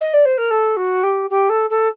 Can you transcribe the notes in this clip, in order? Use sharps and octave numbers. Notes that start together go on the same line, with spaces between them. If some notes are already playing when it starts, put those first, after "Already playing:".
D#5
D5
C5
A#4
A4
F#4
G4
G4
A4
A4